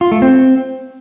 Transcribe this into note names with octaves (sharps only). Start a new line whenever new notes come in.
F4
A3
C4